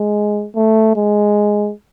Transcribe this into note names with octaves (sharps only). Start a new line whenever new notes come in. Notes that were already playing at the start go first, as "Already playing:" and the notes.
Already playing: G#3
A3
G#3